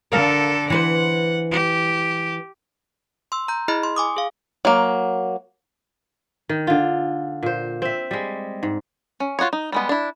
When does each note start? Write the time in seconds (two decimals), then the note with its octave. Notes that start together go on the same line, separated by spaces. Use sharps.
0.12 D3 A4 A#4 F5
0.70 E3 B4 C5 F#5
1.51 G4
3.32 C6 E6
3.48 A#5 G6
3.68 E4 G#4 D#5 B5 F6
3.83 C6
3.96 G#5 D6 D#6
4.17 G#4 F5
4.65 F#3 A#3
6.49 D#3
6.67 D3 F4
7.43 A#2 C5
7.82 C4 E5
8.11 G3 G#3
8.63 G#2
9.20 C#4
9.39 F4 F#4 G#4 C#5
9.53 D#4
9.72 G3 G#3 B3
9.89 D4 E4